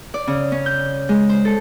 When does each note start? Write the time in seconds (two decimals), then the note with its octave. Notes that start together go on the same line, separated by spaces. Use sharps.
0.14 D5
0.27 C#3
0.52 C#4
0.66 G6
1.09 G#3
1.29 C5
1.45 A4